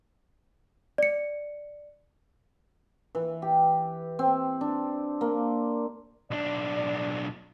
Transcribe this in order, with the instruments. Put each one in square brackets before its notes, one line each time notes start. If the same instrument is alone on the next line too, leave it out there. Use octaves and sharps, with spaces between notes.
[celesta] D5 C#7
[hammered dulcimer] E3
G4
C4
D4
A#3
[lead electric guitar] B1 D4 [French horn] D5